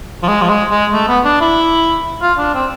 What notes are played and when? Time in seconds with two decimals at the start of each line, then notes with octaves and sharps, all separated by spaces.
0.23 F3
0.28 G#3
0.42 F3
0.49 G#3
0.71 G#3
0.93 A3
1.08 B3
1.25 D4
1.41 E4
2.22 F4
2.38 D4
2.54 C4